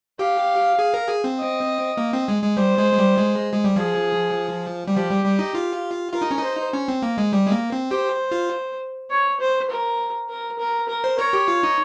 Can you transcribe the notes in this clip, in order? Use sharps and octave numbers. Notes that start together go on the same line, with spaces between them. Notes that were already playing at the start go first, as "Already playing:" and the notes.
G4 F5
G#4
A#4
G#4
C4
D#5
A#3
C4
G#3
G#3
G3 C5
G#3
G#3
G3
G#3
G#3
G3
F3 G#4
G3
F3 G4
G3
G3
D#4
F4
F4 A#4
D#4
C#4
D#4
C5
C#4
C4
A#3
G#3
G3
G#3
A#3
C4
G4 C5
F4
C#5
C5
A#4
A#4
A#4
A#4
C5
A#4 C#5
G4
F4
D#4